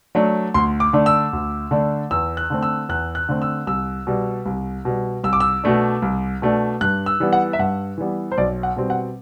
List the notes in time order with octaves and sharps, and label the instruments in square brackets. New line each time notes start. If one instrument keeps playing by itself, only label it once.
[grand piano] F#3 A3 D4
D2 C6
D6
D3 A3 D4
E6
D2
D3 A3 D4
E2 E6
F#6
D3 A3 C4
E6
E2 F#6
F#6
D3 A3 C4
E6
C2 E6
B2 G3
C2
B2 G3
C2 E6
D6
E6
B2 A3 D4
C2
B2 A3 D4
G2 F#6
E6
E3 G3 B3
F#5
E5
G2 F#5
E3 G3 B3
C5
B1 D5
F#5
B2 G3 C4
F#5